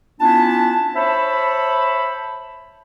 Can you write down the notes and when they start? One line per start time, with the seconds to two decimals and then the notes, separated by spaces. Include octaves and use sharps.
0.20 B3 C#4 D4 E4 F4 A5
0.96 C5 C#5 E5 A5 B5